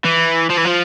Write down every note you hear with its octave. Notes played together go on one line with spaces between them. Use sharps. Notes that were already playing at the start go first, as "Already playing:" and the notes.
E3
F3
E3
F3